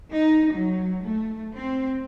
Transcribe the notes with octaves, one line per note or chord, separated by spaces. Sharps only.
D#4
F#3
A3
C4